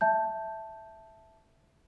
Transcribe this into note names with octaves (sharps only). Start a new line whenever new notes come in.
E5 A5 G6